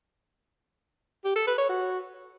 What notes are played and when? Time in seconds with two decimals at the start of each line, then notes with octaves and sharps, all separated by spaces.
1.25 G4
1.36 A4
1.47 B4
1.58 C#5
1.70 F#4